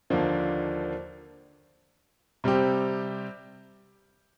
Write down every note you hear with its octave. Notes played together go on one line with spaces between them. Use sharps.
D#2 D3 F3 A#3 D4
C3 G3 C4 G4